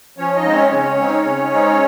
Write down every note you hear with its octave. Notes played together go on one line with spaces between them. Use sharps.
F3 C#4 C#5
D#4 D#5
G#3 C4 C5
C#4 C#5
C#3 C#4 C#5
G#3 C4 D#4
C#3
G#3 C4 D#4